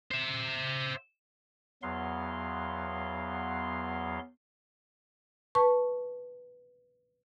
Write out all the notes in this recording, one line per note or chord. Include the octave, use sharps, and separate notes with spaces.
C5 E5
E2 F#3 B3 F5 C6
B4 A5 C#6